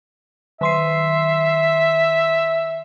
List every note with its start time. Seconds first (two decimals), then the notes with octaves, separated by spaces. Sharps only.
0.61 D#3 E5 C6 C7